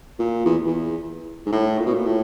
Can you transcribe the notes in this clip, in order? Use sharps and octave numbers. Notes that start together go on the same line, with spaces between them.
A#2
E2
E2
G#2
A2
A#2
B2
A#2
A2